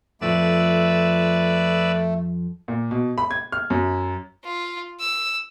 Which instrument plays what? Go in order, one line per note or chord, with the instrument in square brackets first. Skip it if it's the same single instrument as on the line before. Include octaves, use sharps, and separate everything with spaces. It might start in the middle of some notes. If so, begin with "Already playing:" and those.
[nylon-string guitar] F2 F3 [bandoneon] A3 [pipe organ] B4 D5 E6
[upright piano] A#2
B2
B5
G#6
F6
F#2
[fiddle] F4
E6